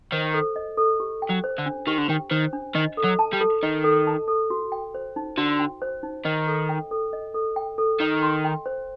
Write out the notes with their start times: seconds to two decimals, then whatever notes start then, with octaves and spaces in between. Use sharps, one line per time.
0.12 D#3 C5
0.34 A4
0.56 D#5
0.77 A4
1.00 G4
1.22 G5
1.29 F#3
1.44 C5
1.58 D3
1.66 D4
1.87 D#3 G4
1.98 D3
2.09 D#3 G5
2.31 D#3 C5
2.53 D4
2.75 D#3 D#5
2.97 A4
3.04 F#3
3.19 A5
3.33 G3
3.40 A4
3.63 D#3 D#5
3.84 A4
4.07 A5
4.28 A4
4.50 F#4
4.72 G5
4.94 C5
5.16 D#4
5.37 D3 F#4
5.59 G5
5.82 C5
6.03 D#4
6.25 D#3 D#5
6.47 A4
6.69 G5
6.91 A4
7.13 D#5
7.34 A4
7.56 G5
7.78 A4
8.00 D#3 D#5
8.23 C6
8.44 G5
8.66 C5